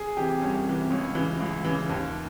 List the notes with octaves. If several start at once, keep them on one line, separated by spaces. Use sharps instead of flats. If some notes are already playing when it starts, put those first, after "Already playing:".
Already playing: G#4
C3 E3 G4
C2 C#4
C3 E3
C#2 C#4
C#3 E3
C#2
C#3 E3
D#2